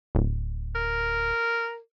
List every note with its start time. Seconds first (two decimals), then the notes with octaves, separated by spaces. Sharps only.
0.15 D1
0.75 A#4